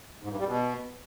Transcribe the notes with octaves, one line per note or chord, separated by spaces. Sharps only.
G#2
G2
G3
B2